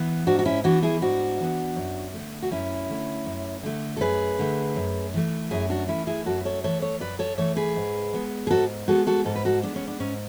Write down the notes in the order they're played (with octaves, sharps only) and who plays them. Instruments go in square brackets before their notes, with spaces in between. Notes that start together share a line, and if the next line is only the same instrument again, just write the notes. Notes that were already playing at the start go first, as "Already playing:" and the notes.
Already playing: [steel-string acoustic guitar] E3 B3
G#2 D4 F#4
F#4
C#4 E4
E3 B3 D4 F#4
E4 G#4
G#2 D4 F#4
E3 B3
F#2
D3 A3
F#4
F#2 C#4 E4
D3 A3
F#2
D3 A3
A4
F#2 G#4 B4
D3 A3
F#2
E3 A3
F#2 E4 G#4
D4 F#4
E3 A3 C#4 E4
E4 G#4
F#2 F#4 A4
B4
A4 C#5
E3 A3 A4 C#5
A4 C#5
F#2 B4 D5
A4 C#5
E3 A3 A4 C#5
G#4 B4
G#2
G#3 B3
G#4
G#2 F#4 A4
G#3 B3 F#4 A4
F#4 A4
G#2 A4
B4
F#4 A4
G#3 B3 D4
C#4
D4
G#2 C#4